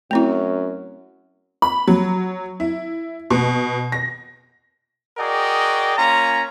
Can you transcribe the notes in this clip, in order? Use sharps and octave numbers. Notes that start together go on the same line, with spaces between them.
F#2 A3 C4 E4
B5
F#3
E4
B2
A#6
F#4 G#4 A#4 D5 D#5 G5
A#3 C#4 F4 A#5